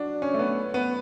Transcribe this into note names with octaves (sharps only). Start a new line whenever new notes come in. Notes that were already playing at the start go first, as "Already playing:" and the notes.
Already playing: D4 F#4
C#4
A3
B3
B3